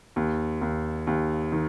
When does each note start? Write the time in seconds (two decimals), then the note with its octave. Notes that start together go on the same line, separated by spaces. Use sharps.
0.16 D#2
0.61 D#2
1.07 D#2
1.52 D#3